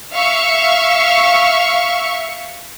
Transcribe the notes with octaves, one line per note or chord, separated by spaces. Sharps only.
E5 F5 C#6